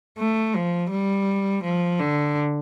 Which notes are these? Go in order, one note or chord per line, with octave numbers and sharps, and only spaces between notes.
A3
F3
G3
F3
D3